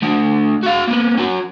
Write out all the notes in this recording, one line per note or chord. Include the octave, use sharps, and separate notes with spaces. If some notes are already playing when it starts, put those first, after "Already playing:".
A3 D4
F#4 F5
A#3 B3
C#4 F#4